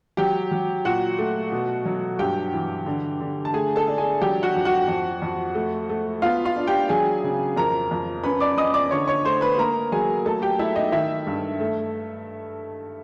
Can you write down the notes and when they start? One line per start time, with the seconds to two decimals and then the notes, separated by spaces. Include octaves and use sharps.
0.17 F#3 G4 G5
0.52 F#3
0.85 A#2 F#4 F#5
1.19 A3
1.52 B2
1.85 F#3
2.19 G2 G4 G5
2.53 E3
2.86 D3
3.20 D3
3.45 A5
3.53 A3 G#4 G#5
3.76 A4 A5
3.88 D4
3.98 G#4 G#5
4.22 F#3 G4 G5
4.43 F#4 F#5
4.55 F2
4.65 F#4 F#5
4.88 F2
5.22 F2
5.55 A3
5.90 A3
6.22 B3 F4 F5
6.45 F4 F5
6.56 D4
6.67 G4 G5
6.89 F#3 G#4 G#5
7.24 C#3
7.56 F2 A#4 A#5
7.91 F2
8.24 C#4 B4 B5
8.40 D5 D6
8.58 C#4 D#5 D#6
8.74 D5 D6
8.91 D3 C#5 C#6
9.08 C#5 C#6
9.25 A3 C5 C6
9.41 B4 B5
9.58 A#3 A#4 A#5
9.92 F#3 G#4 G#5
10.25 A3 A4 A5
10.42 G4 G5
10.59 A3 E4 E5
10.76 D#4 D#5
10.92 D#3 E4 E5
11.27 G2
11.60 A3